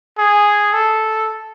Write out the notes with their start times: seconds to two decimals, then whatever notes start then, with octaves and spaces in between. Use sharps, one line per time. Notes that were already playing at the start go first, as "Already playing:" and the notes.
0.18 G#4
0.73 A4